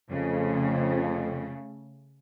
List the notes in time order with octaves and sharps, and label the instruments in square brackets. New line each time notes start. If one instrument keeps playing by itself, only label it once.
[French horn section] F2 [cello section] C#3 A3